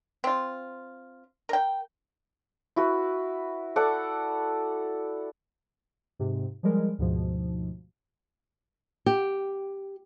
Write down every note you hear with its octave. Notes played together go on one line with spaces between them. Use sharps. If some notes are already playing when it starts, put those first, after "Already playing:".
C4 F4
A#4 G5
E4 F#4 B4
A4 D5 F#5 D6
G#2 C3
F3 G3 G#3 A#4
D2 G#2 B2 F3
G4